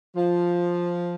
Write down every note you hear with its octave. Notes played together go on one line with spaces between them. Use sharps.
F3